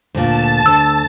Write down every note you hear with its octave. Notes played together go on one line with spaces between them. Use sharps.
D2 A#2 A5
D2 E6